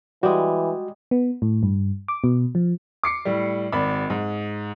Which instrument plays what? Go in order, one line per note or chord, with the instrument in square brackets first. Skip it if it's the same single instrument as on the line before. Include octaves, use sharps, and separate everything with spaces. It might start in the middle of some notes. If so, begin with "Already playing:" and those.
[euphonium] E3 [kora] G3 G#3 [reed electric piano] F#4
[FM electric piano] B3
A2
G2
D6
B2
F3
[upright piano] D6 C7 C#7
A2 G3
G#1 D5 B5
G#2